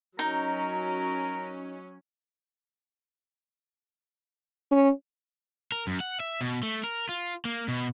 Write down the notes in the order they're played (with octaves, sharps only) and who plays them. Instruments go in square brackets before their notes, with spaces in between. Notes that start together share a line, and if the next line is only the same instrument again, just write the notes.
[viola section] F#3 C#4 [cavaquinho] D#4 [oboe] A#4
[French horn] C#4
[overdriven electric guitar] A#4
F#2
F#5
E5
B2
A3
A#4
F4
A#3
B2